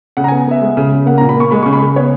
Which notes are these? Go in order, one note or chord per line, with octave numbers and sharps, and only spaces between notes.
C#3 F#5
A#5
B3 G#5
B3 E5
G#3
C#3
C#3
A#3 F#5
A#2 A#5
B5
A#3 C#6
G#3 B5
C#3 C#6
B5
C#3
B3 C#5